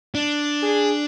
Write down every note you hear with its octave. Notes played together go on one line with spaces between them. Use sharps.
D4
G#4